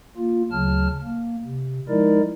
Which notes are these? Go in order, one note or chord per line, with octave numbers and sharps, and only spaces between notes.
A#3 F4
D2 C#3 F#3 A5 F6
A#3
C3
F3 G#3 D#4 E4 A#4 D5